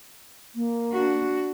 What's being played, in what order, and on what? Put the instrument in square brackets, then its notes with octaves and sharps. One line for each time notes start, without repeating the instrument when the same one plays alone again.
[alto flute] A#3
[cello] D4 F#4